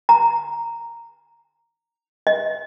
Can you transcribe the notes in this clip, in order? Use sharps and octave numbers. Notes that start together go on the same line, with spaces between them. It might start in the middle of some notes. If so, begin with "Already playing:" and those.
A#5
D#5